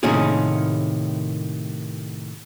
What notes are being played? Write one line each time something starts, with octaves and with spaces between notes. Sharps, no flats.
A2 C3 D#3 A#3 C#4 G#4